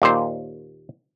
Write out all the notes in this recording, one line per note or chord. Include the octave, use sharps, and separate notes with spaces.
D#2 A#2 C5